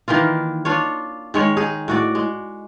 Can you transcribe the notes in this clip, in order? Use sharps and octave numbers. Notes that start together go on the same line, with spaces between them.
D#3 E3 A#3 F4
D4 F4 C#5
D#3 G#3 C#5
D#4 G#4
A2 F#4 D5
G#3